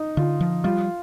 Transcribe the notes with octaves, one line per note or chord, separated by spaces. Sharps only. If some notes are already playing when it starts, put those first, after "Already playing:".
Already playing: D#4
D3 F4
F3
G3 F4